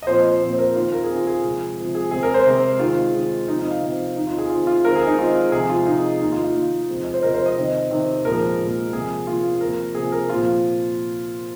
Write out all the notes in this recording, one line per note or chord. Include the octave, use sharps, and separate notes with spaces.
D#5
A#2 F3 C4 C5
A#2 F3 C4
C5
A#4
D#3 C4 F4
A#4
G#4
D#3 C4
F4
G#4
C3 F3 G#3
C3 F3 G#3
G#4
C3 G#3 C4 G#4
A#4
C5
C3 G#3 C4
D#3 G#3 C4 F4
D#3 G#3 C4
C3 F3 C4 D#4
D#4
F5
C3 F3 C4
D#3 C4 D#4
F4
G#4
D#3 C4 F4
F4
D#3 G#3 C4 A#4
G#4
D#4
D#3 G#3 C4 F4
C3 F3 G#3 G#4
F4
C3 F3 G#3 D#4
D#3 A#3 D#4
F4
F4
D#3 A#3
C3 F3 G#3 C4
D#5
C5
C3 F3 G#3 C4 A#4
C5
D#5
C3 D#3 C4
C3 D#3 C4
A#2 F3 G#3 A#4
A#2 F3 G#3
C3 F3 A#3 G#4
C3 F3 A#3 F4
C3 F3 A#3 A#4
C3 F3 A#3 G#4
A#4
A#2 F3 C4 F4